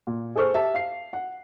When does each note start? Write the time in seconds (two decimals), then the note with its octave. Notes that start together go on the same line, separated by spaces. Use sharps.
0.07 A#2
0.36 G#4 A4 C5 C#6 F6
0.54 G4 E5 A5
0.74 F5 C7
1.13 F#5